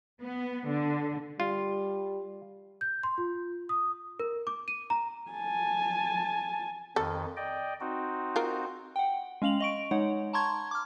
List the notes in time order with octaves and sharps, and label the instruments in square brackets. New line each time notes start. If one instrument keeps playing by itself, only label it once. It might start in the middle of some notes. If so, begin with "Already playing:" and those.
[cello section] B3
D3
[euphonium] G3 [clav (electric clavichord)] F4
[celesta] G6
C6
F4
D#6
A#4
D6
D#7
A#5
[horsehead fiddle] G#5 A5
[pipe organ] F2 D#3 [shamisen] A4
[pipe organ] D5 D#5 G5
C4 D#4 F#4
[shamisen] F4 A#4
[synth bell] F#5 G5
G#3 C#4 F5 F7 F#7
D#5 C#6 D7
G#3 D#4 C#5 F#5
A5 A#5 C6 C#6 G#6
D6 F6